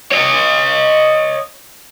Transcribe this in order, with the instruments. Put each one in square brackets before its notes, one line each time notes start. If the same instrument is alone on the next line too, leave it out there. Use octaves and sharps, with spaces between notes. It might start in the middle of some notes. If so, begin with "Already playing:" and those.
[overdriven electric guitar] C#5 D#5